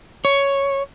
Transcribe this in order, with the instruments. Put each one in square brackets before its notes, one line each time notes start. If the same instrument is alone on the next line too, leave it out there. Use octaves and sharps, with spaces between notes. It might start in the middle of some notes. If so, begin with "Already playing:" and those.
[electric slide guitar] C#5